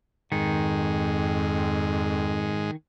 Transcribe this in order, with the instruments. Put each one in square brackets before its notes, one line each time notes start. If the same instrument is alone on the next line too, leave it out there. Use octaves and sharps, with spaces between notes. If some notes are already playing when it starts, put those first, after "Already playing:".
[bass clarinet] F2 [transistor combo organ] G#2 G#3 [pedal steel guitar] D#3